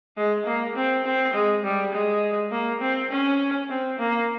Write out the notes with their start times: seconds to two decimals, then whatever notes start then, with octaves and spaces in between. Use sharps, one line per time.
0.17 G#3
0.47 A#3
0.76 C4
1.05 C4
1.34 G#3
1.64 G3
1.93 G#3
2.52 A#3
2.81 C4
3.11 C#4
3.70 C4
3.99 A#3